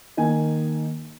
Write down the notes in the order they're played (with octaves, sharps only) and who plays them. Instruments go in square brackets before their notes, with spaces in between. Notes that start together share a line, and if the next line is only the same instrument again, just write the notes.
[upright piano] D#3 A#3 D#4 G#5